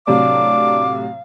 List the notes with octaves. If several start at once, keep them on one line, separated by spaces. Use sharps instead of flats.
A2 C3 F#3 D4 F5 D6